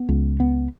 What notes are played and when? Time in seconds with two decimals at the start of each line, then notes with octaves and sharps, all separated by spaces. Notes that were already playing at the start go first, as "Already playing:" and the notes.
Already playing: B3
0.09 C#2
0.40 B3